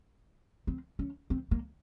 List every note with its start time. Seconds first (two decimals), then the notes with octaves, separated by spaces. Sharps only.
0.67 C4
0.99 C#4
1.30 C4
1.51 A#3